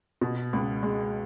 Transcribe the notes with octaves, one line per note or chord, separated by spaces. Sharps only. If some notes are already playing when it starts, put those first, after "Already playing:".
B2
C#2
G#3